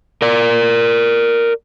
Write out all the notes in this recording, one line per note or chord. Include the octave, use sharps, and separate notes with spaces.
A#4 D5